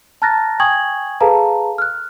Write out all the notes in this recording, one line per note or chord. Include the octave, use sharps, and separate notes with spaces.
A5 A#5 F6 F#6 A6 A#6
G5 G#5 C#6 D#6 G#6 F#7
G#4 A4 B4 F5 A5 A#5
F6 F#6